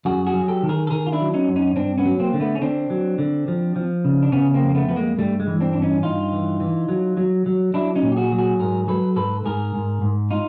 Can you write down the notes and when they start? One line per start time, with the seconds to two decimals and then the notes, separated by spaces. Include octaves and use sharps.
0.05 F#2 F#4 G#4
0.26 F#4 G#4
0.34 F#3
0.48 G4 A4
0.63 D#3
0.69 G#4 A#4
0.87 A4
0.91 D#3 G#4 A#4
1.06 F4
1.13 D4 E4
1.20 F#3
1.34 C#4 D#4
1.48 F#2
1.56 C#4 D#4
1.76 G2 C4 D4
1.98 B3 C#4
2.05 F#3
2.19 A#3 C4
2.33 D3
2.40 A3 B3
2.55 C#4
2.61 D3 C4 D4
2.90 F#3
3.18 D3
3.48 F3
3.76 F3
4.05 C#3
4.23 D4
4.32 C#3 B3 C#4
4.54 A#3 C4
4.61 F2
4.69 A#3
4.75 A3 B3
4.89 F3 B3
4.96 G#3 A#3
5.18 G2 G3 A3
5.40 G#3
5.47 E3
5.60 C4 D4
5.73 G2 D4
5.82 C#4 D#4
6.03 G2 D#4 F4
6.33 E3
6.60 E3
6.89 F#3
7.17 F#3
7.46 F#3
7.74 F#3 D4 E4
7.95 C#4 D#4
8.02 A#2
8.12 G4
8.17 F#4 G#4
8.32 F#3
8.38 F#4 G#4
8.59 G#2 G#4 A#4
8.88 F#3 A4 B4
9.16 G#2 A4 B4
9.45 G#2 G#4 A#4
9.74 G#2
10.01 G#2
10.31 D#4 F4